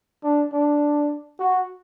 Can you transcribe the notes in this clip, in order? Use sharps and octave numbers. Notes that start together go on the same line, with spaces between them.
D4
D4
F#4